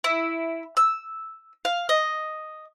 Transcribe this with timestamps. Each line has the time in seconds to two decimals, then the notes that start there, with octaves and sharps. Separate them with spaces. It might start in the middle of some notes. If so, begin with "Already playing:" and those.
0.04 E4
0.77 E6
1.65 F5
1.89 D#5